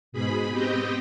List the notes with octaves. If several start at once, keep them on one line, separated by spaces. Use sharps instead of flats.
G#2 B2 G#4 B5
B3 C4 G4 D#5 G5